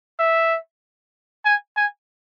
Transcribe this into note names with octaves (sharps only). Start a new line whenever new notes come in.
E5
G#5
G#5